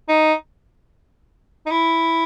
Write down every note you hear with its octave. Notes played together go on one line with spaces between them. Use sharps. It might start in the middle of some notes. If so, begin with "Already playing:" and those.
D#4
D#4
E4